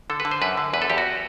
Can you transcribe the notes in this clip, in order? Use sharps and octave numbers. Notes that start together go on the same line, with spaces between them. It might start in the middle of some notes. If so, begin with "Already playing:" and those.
D3 A4
B4
D3
C5
F#2 B4
D3
E2 B4
A4
E2 G4
F#4